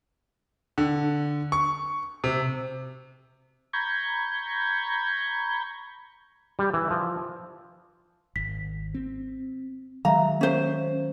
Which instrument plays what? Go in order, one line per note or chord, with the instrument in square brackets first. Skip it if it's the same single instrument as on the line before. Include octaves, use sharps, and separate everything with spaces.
[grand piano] D3
C#6
C3
[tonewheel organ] A#5 B5 C#6 G6 G#6
[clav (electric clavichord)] G3
E3
F3
[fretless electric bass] G#1 [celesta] B6
[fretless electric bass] C4
[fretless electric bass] D#3 F#3 G#3 [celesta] E5 F5 [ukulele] A#5
[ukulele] C#4 C5